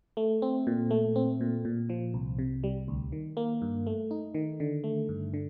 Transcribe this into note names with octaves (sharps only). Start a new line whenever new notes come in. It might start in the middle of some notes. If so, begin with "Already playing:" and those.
A3
C4
A#2
A3
C4
A#2
A#2
F3
C2
C3
G3
D2
D#3
A#3
G2
A3
D#4
D#3
D3
A3
G2
D3